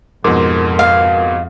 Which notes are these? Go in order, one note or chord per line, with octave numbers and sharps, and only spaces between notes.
F2 G#2 B2 A#4 C6 D6
F5